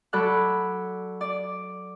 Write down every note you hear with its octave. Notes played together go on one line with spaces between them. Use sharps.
F#3 A4 D5 B5 F#6
D5